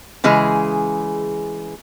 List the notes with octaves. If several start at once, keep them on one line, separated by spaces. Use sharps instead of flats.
C#3 E3 G#3 G#4